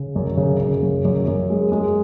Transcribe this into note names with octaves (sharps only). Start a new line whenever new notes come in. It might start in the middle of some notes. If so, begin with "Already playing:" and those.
Already playing: C#3
F#2
C#3
C#3
F#2
F#2
F#2
G#3
G#3